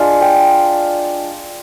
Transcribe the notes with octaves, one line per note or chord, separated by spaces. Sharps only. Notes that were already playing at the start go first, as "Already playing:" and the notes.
Already playing: G#3 D4 F4 F5
G5